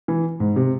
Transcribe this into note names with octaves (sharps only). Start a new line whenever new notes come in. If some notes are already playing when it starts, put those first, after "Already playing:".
E3
G#2
C3